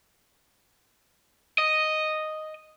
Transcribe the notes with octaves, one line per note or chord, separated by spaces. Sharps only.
D#5